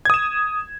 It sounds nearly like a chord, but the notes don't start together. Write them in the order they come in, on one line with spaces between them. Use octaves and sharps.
G#6 D#6 E7